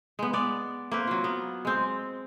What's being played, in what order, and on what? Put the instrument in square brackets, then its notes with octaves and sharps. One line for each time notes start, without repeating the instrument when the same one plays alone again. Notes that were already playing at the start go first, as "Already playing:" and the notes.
[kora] G#3 B3
B3 D5
A#3 C4 B4
F#3 F4
B3
G#3 C4